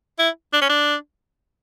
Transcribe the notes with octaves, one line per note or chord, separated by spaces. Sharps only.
E4
D4
C#4
D4